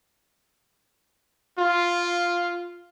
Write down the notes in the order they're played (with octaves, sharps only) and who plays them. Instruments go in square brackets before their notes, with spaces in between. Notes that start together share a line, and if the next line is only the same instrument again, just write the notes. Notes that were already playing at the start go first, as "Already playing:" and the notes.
[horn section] F4